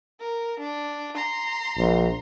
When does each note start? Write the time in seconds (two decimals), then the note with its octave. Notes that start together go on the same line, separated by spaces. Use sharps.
0.20 A#4
0.60 D4
1.15 A#5 C6
1.78 A#1